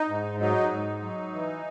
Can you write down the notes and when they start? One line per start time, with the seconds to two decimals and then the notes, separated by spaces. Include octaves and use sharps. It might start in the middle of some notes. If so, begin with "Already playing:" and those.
Already playing: D#4
0.09 G#2
0.40 F#3 D#4
0.71 G#2
1.02 F#3
1.33 E3